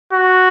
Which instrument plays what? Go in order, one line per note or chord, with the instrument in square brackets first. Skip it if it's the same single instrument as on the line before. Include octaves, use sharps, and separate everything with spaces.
[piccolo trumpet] F#4